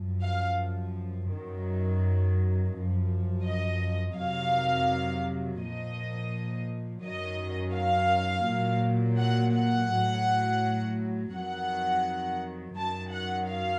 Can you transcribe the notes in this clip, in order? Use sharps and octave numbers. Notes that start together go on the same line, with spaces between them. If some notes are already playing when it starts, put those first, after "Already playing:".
Already playing: F#2 F3
F5
F#2 D#3 F#3
F#2 F3
D#5
F2 C3 D#3 F#3 F5
A#2 F3 D#5
F#2 D#3 F#3 D#5
F5
A#2 F#3
F#5
F#5
A2 F#3
F2 D#3 F#3 F#5
F#2 D#3 F#3 A5
F#5
F5